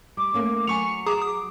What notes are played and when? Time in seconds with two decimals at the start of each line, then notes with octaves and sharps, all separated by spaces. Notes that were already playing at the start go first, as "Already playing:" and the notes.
0.17 G3 D6
0.34 A3 A#3 C#4
0.67 F#3 G#5 C#6 C#7 F7
1.06 G#4 A#5 D6 D#6
1.22 D#6